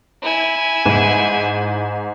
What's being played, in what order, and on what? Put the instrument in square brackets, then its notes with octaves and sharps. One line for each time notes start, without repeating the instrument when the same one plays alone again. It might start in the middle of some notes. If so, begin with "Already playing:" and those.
[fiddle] E4 G#5
[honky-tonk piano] G#2